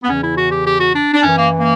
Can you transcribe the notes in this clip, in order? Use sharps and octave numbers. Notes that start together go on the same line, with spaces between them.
B3
E2 C#3 E3 C#4
E4
F#4
G4
G4
F#4
D4
D4
F#2 E3 C#4
A#3
A#3